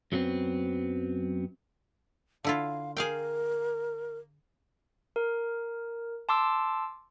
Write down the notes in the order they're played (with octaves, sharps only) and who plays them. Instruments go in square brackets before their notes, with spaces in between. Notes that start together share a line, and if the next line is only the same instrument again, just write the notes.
[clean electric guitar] F#2 F#3 A3 B3 C4
[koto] D3 E4 F4 [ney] F5
[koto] G#4 F5 G5 [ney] A#4
[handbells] A#4
A5 C6 D6 E6